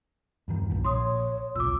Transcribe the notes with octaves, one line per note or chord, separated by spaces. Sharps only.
E2 G2 D#3
B1 G2 A#2
A#1 A#2 C#5 C6 D#6
D#1 B1 F4 D6 E6